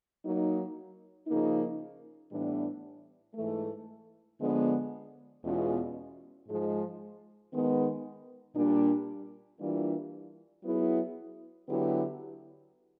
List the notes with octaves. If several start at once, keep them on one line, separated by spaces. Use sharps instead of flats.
F#3 A#3 D#4
C#3 F3 A#3 D#4
A2 E3 G3 B3 D4
G#2 E3 A3
D3 F3 G#3 B3 D4
E2 B2 G#3 C#4 F4
G#2 F3 G#3
D#3 G#3 B3 D#4
A#2 G3 A#3 D4
E3 G3 A#3 D4 F4
F#3 B3 E4 G#4
D3 F#3 B3 E4 G4